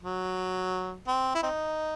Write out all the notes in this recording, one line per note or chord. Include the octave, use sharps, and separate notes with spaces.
F#3
C4
E4
C4 D#4